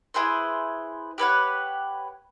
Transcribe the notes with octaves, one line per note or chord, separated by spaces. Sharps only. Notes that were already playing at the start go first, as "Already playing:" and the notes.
E4 G#4 B4 C5
G4 B4 C#5 F#5